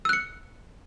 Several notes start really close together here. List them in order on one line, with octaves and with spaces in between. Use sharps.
E6 F#6 C#7